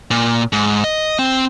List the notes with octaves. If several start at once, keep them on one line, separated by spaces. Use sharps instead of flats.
A#2
G#2
D#5
C4